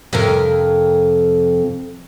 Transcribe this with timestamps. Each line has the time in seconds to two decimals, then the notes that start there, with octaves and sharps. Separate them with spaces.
0.13 F2 C3 A#4